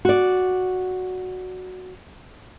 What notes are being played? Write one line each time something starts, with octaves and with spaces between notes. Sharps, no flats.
F#4 D5